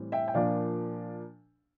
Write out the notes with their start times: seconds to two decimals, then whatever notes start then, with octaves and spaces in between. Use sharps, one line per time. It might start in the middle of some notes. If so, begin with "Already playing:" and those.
Already playing: A2 E3 G3 C4
0.12 E5 G5
0.28 G5
0.34 A#2 F3 A#3 D4 D5 F5